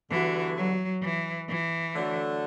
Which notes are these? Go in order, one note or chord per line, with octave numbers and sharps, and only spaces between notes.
D3 E3 G3 B3 F#4
F#3
E3
E3
D3 F#3 A3 D4 F#4